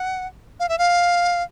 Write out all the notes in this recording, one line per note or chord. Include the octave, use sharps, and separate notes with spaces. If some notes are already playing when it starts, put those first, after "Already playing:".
Already playing: F#5
F5
E5
F5